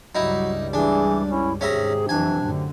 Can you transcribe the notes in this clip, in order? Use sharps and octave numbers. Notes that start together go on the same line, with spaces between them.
C#2 G2 F#3 G3 D#4 E4
E3 D4 G#4
C#4 E4
D#2 G#2 C3 C#4 G#4 E5 A#5
F2 E3 F#3 D4 G#5
F#2 A2 D3